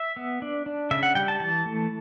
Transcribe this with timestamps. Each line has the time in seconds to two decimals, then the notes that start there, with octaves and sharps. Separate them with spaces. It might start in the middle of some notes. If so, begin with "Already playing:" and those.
Already playing: E5
0.16 B3
0.42 D4
0.66 D4
0.91 C#3 E5
1.03 F#5
1.15 G3 G5
1.28 A5
1.40 E3 A5
1.66 A3